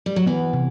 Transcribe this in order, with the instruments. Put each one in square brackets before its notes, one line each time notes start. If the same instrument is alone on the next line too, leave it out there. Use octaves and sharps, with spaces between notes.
[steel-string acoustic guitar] G3
F#3
[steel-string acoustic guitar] E3 [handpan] B3
[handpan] C3